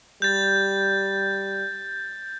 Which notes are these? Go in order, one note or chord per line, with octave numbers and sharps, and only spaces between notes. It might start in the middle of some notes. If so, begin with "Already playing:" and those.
G3 G6 A6